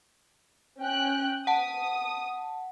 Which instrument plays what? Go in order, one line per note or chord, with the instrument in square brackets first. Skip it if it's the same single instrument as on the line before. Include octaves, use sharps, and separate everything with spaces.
[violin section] C#4 G5 F#6
[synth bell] F#5 A5 [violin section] D#6